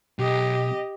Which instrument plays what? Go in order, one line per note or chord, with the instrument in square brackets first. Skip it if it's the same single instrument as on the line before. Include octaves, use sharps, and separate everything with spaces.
[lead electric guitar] B1 [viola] G4 D#5